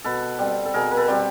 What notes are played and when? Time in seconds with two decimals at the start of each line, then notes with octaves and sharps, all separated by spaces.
0.04 B2 A4 B4
0.39 G3 C4
0.65 A4
0.74 B2 G#4 A#4
0.91 A#4
0.97 A4 B4
1.08 G3 C4 G4